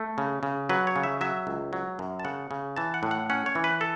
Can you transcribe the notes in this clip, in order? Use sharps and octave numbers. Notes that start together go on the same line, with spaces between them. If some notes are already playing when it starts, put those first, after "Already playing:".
Already playing: A3
C#3
C#3
F#3 B4
C#5
C#3
E5
F#3 E5
C#2
F#3
F#2
A5
C#3 F#5
C#3
E3 A5
F#5
A2
F#5
C#4 F#5
C#5
E3
B4
A4